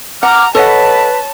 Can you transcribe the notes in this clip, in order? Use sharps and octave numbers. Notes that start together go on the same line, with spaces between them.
F#5 A#5 D6 F6
A4 B4 C#5 D#5 F#5 A5